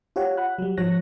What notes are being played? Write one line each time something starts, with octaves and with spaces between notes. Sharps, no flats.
F4 G4 C#5 F#5
F#5 B5 F#6
F#3 G3
G#2 F3 C#5 F#6 A#6